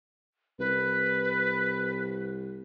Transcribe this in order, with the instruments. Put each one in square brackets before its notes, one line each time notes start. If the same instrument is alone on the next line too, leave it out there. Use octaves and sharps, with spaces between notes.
[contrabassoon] C2 [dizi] B4